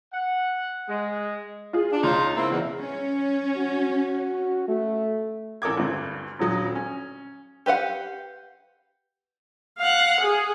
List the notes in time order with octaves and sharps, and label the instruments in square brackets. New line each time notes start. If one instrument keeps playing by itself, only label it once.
[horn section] F#5
G#3
[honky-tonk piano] F4 G#4
[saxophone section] D4
[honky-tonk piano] C#2 C#5 [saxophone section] D#4 F4
[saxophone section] A#3 C4 E4
E2 B2
[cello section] C#4
[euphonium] F#4
A3
[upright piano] A1 A4 A#4 D6 G#6
D2 G2
D#1 D3 F#3 D#6
C#4
[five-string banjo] G4 B4 F5 F#5
[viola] F5 F#5
G#4